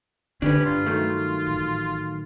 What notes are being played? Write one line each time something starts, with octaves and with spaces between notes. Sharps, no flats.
D3 C#4 D4 G4 B4
G2 F4
D#3 F#3 A3
A1